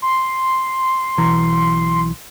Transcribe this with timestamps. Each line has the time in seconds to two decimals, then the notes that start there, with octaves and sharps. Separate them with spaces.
0.02 C6
1.18 B1 E3 A#5